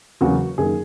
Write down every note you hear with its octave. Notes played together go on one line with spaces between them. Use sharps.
E2 C#3 F#3 A#3 F#4
F#2 D#3 A#3 G#4